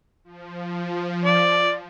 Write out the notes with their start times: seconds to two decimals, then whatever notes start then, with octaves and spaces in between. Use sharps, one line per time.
0.24 F3
1.24 D5